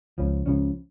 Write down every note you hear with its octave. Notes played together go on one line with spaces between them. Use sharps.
C#2 C#3 F3 C#4
C#2 C#3 F3 C#4